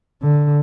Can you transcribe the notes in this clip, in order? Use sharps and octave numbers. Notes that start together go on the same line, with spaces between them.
D3